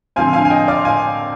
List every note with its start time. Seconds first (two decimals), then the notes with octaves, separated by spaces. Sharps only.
0.16 D3 F3 C4 F5 G#5
0.33 F5 G#5
0.45 G#5
0.50 D#5 G5
0.68 D5 F5
0.85 F5 G#5